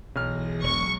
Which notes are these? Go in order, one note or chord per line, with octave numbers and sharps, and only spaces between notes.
B1 E3 G#4 F6 A#6
E1 F#3 G#3 C#6